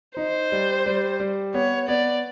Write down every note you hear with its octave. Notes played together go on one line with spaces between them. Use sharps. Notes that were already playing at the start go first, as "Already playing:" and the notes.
D#4 C5
G3
G3
G3
B3 C#5
B3 D5